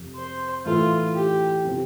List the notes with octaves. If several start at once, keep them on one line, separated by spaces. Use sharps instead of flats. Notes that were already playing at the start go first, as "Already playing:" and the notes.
Already playing: F2 C3 F3
C5
A2 E3 A3 E4 F4 A4
G4
C3 F3 C4